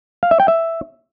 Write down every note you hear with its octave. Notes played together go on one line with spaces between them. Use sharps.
F5
E5
G5
E5